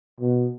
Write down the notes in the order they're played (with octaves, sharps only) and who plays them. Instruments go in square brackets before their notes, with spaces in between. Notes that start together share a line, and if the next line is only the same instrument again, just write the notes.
[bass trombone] B2